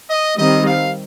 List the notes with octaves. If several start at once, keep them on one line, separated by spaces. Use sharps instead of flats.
D#5
D#3 G3 C4 D#5
F5